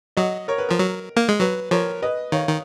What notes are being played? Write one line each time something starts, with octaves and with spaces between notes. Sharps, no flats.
F#3 D#5 F#5
A#4 C#5
B4
F3 A#4
F#3
A#3
G#3
F#3 B4
F3 A#4 C#5
B4 D#5
D#3 C#5 F5
D#3